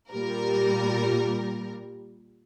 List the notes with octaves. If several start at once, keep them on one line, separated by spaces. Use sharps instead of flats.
A#2 G3 A#4